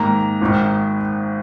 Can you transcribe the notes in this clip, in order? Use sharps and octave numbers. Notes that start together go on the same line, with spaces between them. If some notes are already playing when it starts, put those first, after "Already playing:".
Already playing: G#2 D#3 A#3 A#5
G#1 G#2 D#3